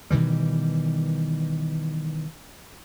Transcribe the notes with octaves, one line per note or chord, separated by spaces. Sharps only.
B2 D#3 E3 G3